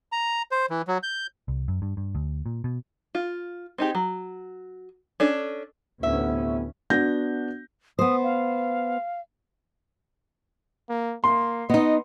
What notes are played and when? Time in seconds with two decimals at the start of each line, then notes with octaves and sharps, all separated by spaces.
0.12 A#5
0.51 C5
0.70 E3
0.88 F#3
1.03 G6
1.48 C2
1.68 F#2
1.82 G2
1.97 G2
2.15 D2
2.46 A#2
2.64 B2
3.15 F4
3.78 C4 D#4 G4 G#4
3.95 F#3
5.20 C#4 D4 A4
6.03 D2 A2 C3 B3 C#4 E5
6.90 B3 D4 F#4 G6 A#6
7.99 B3 C5 D#6
8.24 F5
10.89 A#3
11.24 A#3 C6
11.70 B3 D#4 D#5